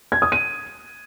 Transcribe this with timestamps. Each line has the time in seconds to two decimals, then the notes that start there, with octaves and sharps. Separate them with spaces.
0.12 G#6
0.22 D#6
0.32 D#7